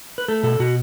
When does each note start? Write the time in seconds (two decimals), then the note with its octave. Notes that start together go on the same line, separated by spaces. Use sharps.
0.18 B4
0.28 A3 A4
0.43 B2 A4
0.59 B2 F#4